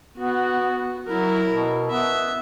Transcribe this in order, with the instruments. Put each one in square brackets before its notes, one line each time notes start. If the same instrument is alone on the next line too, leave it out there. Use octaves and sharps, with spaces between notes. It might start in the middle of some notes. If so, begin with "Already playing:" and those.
[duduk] B3 [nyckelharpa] F#4
[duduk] F#3 [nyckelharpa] E4 A#4
[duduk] B2
[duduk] B3 [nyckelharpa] E5